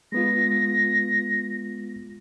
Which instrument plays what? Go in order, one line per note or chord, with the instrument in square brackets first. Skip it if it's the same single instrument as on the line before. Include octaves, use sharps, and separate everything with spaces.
[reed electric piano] G#3 B3 F4 [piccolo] A#6